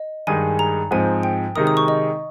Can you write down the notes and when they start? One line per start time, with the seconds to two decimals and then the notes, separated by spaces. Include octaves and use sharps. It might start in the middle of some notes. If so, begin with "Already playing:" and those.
Already playing: D#5
0.27 G2 D#3 G#3 D#4 G#4 G#5
0.59 A#5
0.91 G#2 F3 C4 D#4 G#5
1.23 G5
1.55 C3 D#3 G#3 D#4 A#4 D#6
1.67 D#6
1.77 C#6
1.88 D#5